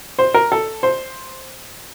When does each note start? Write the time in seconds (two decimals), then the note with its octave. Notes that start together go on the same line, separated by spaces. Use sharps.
0.19 C5
0.34 A#4
0.52 A4
0.83 C5